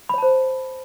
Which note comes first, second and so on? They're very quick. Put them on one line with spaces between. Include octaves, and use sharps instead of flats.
B5 C#5 A5 C5